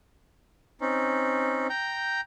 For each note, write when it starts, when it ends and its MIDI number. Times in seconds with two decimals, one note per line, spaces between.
0.81 1.67 60
0.81 1.67 61
0.81 1.67 63
1.70 2.21 79
1.70 2.21 82
1.70 2.21 91